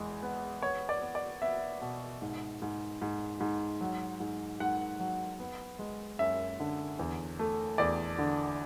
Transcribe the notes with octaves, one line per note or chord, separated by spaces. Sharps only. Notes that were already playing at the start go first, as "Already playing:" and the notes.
Already playing: E2 G#3
B3
B3 C#5
D5
B3
D5
B3 E5
B2
G#2
G#2
G#2
G#2
F#3
G#2
G#2 F#5
F#3
B3
G#3
F#2 E5
D3
E2
A3
E2 D5
D3